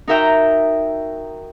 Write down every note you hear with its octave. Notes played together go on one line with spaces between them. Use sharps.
D#4 F#4 A#4 E5 G5 A#5